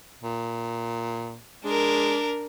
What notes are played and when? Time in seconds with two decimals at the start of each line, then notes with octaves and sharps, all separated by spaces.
0.23 A#2
1.65 G#3 D4 A#4